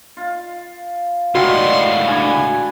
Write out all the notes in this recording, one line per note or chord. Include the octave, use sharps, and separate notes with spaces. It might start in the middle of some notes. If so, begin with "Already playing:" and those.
F4
C#2 A2 D#3 G3 F#4 F5 C6
D4 E4 G#5